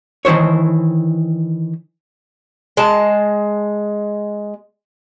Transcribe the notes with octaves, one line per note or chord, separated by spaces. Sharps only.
D#3 E3 E4 C5 C#5
G#3 A5